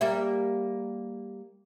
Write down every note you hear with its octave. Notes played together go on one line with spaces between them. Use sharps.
G3 A#3 E5